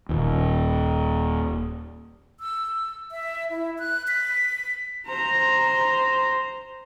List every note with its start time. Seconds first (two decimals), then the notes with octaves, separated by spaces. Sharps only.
0.09 D#1 D#2
2.40 E6
3.12 E5
3.50 E4
3.79 F#6
4.08 B6
5.07 C5 A#5